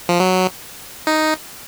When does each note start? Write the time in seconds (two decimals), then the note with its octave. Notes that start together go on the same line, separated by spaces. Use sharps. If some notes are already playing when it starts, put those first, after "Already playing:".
0.09 F3
0.20 F#3
1.07 D#4